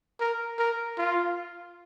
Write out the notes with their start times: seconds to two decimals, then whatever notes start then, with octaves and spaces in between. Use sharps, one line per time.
0.20 A#4
0.59 A#4
0.98 F4